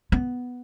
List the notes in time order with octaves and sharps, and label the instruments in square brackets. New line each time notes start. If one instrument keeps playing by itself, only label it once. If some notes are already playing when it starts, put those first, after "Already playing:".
[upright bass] B3